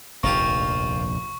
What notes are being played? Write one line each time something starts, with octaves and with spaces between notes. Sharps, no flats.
F1 A#1 D#2 A#3 F4 G4 C#6